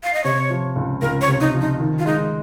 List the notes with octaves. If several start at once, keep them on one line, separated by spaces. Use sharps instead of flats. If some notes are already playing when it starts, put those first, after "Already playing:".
F5
D#5
C3 C#5
F3
C#2
C#2 A#4
C#5
C3
D#4
F3
D#4
D#3
F4
G#3 D#4